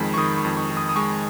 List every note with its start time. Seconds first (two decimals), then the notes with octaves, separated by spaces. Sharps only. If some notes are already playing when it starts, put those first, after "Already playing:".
Already playing: F2 D#3 G#3 B5
0.14 C#6
0.17 D#3 D#6
0.38 C#6
0.45 F2
0.57 C#6
0.70 D#3
0.77 D#6
0.89 D#6
0.96 G#3 C#6